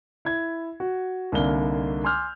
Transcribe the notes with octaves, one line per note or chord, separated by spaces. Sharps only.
E4 G#6
F#4
C2 D3 A#3 D#4 F5 G7
G#5 C6 D6 E6 F6 G6